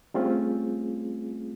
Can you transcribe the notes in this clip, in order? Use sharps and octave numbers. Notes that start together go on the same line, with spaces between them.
G3 A3 C4 C#4 F4 G#4